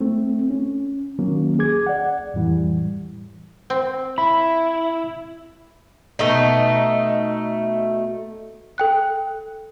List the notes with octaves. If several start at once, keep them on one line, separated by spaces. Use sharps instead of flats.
A3 C4
C#4
D#3 F#3 A#3 C#4
G#4 D6 G#6
D5 F#5
F2 A2 E3 G3
C4
E4 B5
B2 A3 D#4
A4 G5 F#6